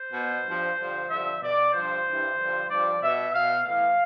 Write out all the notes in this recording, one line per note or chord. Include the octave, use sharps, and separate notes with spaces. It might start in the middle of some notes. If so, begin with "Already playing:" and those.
Already playing: C5
B2
G2 F3
G2 D3 F3
G2 D3 F3 E5
B2 D5
G2 F3 C5
G2 E3
G2 D3 F3
G2 F3 D5
B2 E5
B2 F5
A2 E3 F5